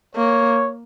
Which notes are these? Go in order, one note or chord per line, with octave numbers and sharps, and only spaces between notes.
A#3 C#5